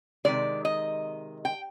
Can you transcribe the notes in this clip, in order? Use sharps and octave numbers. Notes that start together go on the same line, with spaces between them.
C3 D#3 G#3 D5
D#5
G5